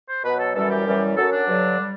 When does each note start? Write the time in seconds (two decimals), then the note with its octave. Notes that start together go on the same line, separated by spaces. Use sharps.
0.09 C5
0.24 B2 F#3 B4
0.39 A4
0.55 F#2 E3 G3 A4
0.70 G4
0.86 F#2 E3 G3
1.17 F#2 F#3 A4
1.33 D4
1.48 G2 D3 F#3
1.79 G3